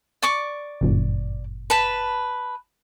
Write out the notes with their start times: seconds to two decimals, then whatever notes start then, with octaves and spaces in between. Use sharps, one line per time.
0.22 D5 C#6 D6
0.81 G1 F#2 A#2
1.70 B4 A5 B5